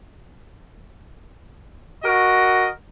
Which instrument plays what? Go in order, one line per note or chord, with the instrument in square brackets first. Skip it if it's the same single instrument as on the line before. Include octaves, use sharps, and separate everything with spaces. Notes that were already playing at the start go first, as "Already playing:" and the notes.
[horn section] F#4 A#4 D#5